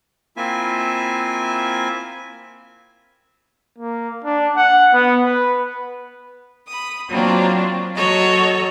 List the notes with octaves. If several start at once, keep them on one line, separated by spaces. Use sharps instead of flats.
A#3 C4 E4 F4 E5 G#5
A#3
D4
F#5
B3
B4
B5 D#6
F#3 A#3 C4 D4 F4
F#3 F#4 A4 C#5 D#5